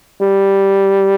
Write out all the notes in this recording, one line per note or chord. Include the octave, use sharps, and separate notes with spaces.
G3